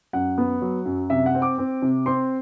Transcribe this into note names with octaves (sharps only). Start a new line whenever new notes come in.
F#2 F#5
B3
F#3
F#2
C3 E5
F#5
C4
D6
C4
C3
C4 C6